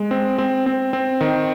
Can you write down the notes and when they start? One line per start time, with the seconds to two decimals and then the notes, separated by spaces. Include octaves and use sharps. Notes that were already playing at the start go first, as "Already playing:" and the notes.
Already playing: G#3
0.11 C4
0.38 C4
0.66 C4
0.93 C4
1.21 D#3